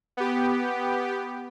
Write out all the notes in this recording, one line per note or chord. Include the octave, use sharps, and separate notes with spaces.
B3 G4